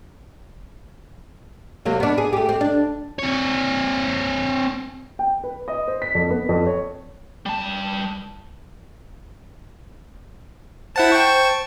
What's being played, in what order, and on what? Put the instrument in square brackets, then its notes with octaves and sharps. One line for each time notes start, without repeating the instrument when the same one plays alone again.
[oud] C3 F#3 A#3
B3 D4
G#4
A3 G4
C4 G4
D4
[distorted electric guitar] C4 C#5
[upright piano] G5
B4
D#5
C5
B6
F2
B3
F2
C#5
[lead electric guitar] G3 A5
[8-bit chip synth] E4 F#5 A5 [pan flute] C5
[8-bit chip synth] G5 A5 C#6